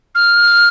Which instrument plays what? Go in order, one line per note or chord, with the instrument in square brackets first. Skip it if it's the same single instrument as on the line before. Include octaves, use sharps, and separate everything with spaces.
[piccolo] F6